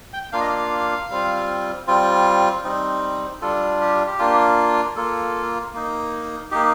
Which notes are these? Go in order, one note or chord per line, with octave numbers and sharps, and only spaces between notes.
G5
A#3 D4 F4 F5
D#5
F5
G3 C4 F4
G3 C4 F4
G3 C4 D#4
G3 D4 F4 A4
G4
G4
A#3 D4 F4
A#3 F4 A4
A#3 D#4
A#3 D#4 G4